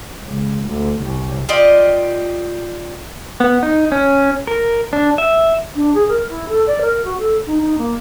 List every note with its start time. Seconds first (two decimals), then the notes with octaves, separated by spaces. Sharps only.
0.23 C#2
0.68 D2
1.00 C2
1.49 F4 G4 D5 D#5
3.40 B3
3.63 D#4
3.92 C#4
4.47 A#4
4.93 D4
5.18 E5
5.75 D4
5.94 G#4
6.09 A#4
6.30 E4
6.49 A4
6.67 D5
6.81 A#4
7.04 F#4
7.19 A4
7.46 D#4
7.61 D#4
7.78 A#3